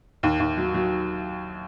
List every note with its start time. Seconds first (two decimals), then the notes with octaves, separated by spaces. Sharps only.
0.23 D#2
0.40 D#2
0.57 F#3
0.74 F#3